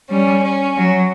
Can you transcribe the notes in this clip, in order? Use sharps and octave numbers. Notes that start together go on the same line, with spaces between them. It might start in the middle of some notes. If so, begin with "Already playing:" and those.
G3 C#4
C#4
F#3